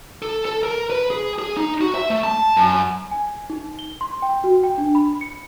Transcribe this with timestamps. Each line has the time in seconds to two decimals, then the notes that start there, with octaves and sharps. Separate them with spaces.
0.22 A4
0.45 A4
0.63 A#4
0.90 B4
1.10 G#4
1.39 G#4
1.57 D#4
1.81 F#4
1.95 E5
2.10 A3
2.24 A5
2.57 F#2
3.11 G#5
3.50 D#4
3.79 G7
4.01 C6
4.22 G5
4.44 F#4
4.64 G5
4.78 D4
4.95 B5
5.21 C#7